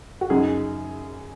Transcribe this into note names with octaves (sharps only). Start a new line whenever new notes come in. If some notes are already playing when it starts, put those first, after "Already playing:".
F#4
F#2 C#3 D#4 G#4